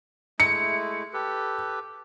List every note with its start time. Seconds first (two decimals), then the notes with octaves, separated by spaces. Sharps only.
0.40 G#3 A3 E4 C#7
1.13 G4 A4 B4